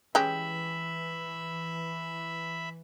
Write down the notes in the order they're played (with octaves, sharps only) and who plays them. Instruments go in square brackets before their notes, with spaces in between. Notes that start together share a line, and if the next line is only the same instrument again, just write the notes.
[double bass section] E3 [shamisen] G#3 C#4 G4 [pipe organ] E5 B5